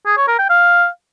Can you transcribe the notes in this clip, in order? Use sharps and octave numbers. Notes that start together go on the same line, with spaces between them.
G#4
C#5
A#4
G5
F5